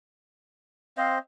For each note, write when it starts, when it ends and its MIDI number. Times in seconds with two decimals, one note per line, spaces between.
0.97 1.19 60
0.97 1.19 72
0.97 1.19 75
0.97 1.16 77